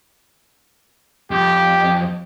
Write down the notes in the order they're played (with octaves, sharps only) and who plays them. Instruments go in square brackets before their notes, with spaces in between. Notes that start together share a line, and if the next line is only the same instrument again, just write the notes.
[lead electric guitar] F2 [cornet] G4